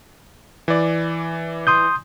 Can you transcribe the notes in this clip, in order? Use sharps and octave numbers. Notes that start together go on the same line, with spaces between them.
E3 D5
C6 D#6 G6